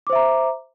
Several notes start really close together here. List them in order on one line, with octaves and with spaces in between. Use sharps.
D6 C5 E5 A#5